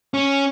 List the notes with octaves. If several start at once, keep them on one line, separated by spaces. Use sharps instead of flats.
C#4